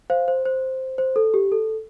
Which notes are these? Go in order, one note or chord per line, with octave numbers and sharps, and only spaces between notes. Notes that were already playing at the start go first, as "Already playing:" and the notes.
C5 F5
C5
C5
C5
A4
G4
A4